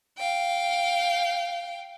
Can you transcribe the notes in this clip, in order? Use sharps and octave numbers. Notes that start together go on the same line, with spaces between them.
F5 G5